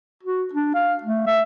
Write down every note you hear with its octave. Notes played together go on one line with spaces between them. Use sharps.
F#4
D4
F5
A3
E5